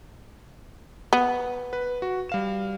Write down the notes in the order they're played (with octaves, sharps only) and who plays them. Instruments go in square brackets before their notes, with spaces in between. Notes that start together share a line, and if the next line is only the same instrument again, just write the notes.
[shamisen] B3
[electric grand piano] B4
F#4
G3 F5 E7